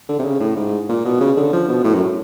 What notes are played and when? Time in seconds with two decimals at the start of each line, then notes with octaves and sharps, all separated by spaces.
0.09 D3
0.19 C3
0.25 C#3
0.40 A2
0.56 G#2
0.89 A#2
1.05 B2
1.20 C#3
1.37 D3
1.53 F3
1.68 B2
1.84 A2
1.94 F#2